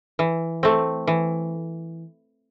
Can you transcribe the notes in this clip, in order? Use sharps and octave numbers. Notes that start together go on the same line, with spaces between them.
E3
A3 C4
E3